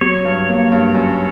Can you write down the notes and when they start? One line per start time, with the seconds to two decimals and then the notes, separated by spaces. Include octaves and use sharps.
0.01 F#3 C#5
0.25 G2
0.48 A#3
0.72 G2
0.95 F#2